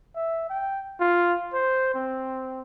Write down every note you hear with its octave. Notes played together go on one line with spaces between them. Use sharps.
E5
G5
F4
C5
C4